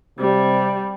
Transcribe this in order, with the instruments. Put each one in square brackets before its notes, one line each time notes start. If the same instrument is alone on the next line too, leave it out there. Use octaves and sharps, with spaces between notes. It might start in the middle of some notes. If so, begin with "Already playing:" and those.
[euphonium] C3 [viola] G3